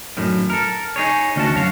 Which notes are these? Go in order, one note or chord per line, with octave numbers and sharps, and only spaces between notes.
F#2 A2 D#3
A4 A#4
D#4 G#4 C#5
D2 D#3 C#4 F#4 F#5 A5
F#2 F#4 C#5 F5